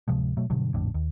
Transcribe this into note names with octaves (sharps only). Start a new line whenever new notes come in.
D1 C3 F3 G#3
B2 F#3 A3
G2 B2 D3 F#3
A#1 F2 A2 D3
D#2